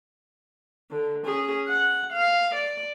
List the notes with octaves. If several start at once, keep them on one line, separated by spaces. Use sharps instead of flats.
D3
C#4 G#4
F#5
F5
D5